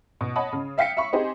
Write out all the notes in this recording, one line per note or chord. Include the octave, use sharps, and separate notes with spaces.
B2
C#5 D#5 F#5 A5 B5 D#6
C#3
E5 F5 G5 B6 C#7
E5 F5 B5 C#6
C4 D#4 G4 G#4 C5